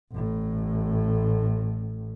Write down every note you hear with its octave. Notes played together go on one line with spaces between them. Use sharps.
A1 A2